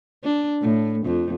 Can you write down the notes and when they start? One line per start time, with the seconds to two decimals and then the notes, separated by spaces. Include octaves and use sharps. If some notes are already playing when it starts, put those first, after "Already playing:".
0.24 D4
0.62 A2
1.06 F2